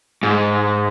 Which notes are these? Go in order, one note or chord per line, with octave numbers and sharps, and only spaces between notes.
G#2